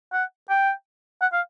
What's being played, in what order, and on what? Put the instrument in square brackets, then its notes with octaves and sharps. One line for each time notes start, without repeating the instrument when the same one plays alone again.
[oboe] F#5
G5
F#5
F5